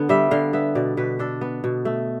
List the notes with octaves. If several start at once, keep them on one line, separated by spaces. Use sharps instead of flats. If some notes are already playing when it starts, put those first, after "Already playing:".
Already playing: D3 B3
G3 E5
D3 F5
B3 E5
B2 D5
B2 B4
D4 A4
B3
B2
A3